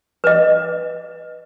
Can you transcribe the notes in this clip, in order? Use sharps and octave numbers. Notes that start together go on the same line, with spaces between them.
B4 D#5